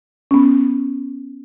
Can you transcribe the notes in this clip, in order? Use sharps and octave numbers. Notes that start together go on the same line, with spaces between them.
B3 C#4